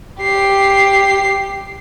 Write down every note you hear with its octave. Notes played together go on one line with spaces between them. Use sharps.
G4 C7